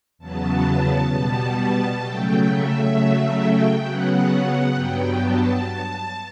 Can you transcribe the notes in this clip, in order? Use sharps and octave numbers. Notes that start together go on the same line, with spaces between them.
E2 C#3 F#3 B3 A5
B2 G3 B3 A5
C#3 F#3 A3 G5
E5
C#3 F#3 A3
G5
C#3 F#3 B3 F#5
G2 F#3 B3 G5
A5